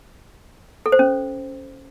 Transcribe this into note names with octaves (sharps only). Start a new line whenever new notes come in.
A4
C5
C#4